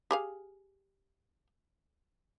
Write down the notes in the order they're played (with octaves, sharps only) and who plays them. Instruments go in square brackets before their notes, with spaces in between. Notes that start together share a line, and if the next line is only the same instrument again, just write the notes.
[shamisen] G4 G#4 F5